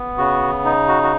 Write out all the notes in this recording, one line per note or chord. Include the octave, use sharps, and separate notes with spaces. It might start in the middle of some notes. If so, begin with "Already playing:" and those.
Already playing: B3
C#3 F#4
D#4
F#4
F#4